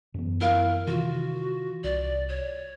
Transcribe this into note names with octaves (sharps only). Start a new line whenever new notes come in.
F#2 E3 B3
E4 A#4 F5
C3 D#3 E3 F4 F#4
C2 D5
C#5